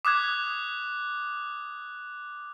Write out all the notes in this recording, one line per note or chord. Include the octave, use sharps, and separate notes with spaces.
D6 D#6 F#6 G#6